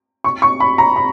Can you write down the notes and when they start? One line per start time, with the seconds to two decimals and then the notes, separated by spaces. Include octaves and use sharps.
0.24 C#6
0.42 C#6
0.60 B5
0.78 A#5
0.96 B5